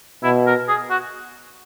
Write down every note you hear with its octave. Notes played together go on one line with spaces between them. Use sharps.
B2 E4
A#4
G#4
F#4